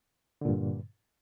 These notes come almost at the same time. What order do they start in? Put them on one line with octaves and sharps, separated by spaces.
D3 A#2 G2